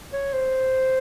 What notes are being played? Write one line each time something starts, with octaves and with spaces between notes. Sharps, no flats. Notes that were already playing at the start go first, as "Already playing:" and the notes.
C#5
C5